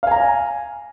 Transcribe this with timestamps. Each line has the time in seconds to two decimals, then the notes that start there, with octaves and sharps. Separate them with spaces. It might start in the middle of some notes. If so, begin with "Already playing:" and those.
0.03 F5
0.07 G#5
0.11 A#5